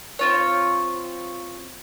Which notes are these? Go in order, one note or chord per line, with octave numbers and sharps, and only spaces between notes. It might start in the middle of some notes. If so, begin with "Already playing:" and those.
C4 F4 C#5